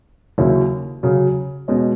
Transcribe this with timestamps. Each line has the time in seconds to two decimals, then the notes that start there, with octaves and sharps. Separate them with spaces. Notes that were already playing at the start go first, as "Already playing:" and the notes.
0.38 D#2 C#3 F#3 C#4 E4
1.03 C#3 F#3 C#4
1.68 B2 G#3 C#4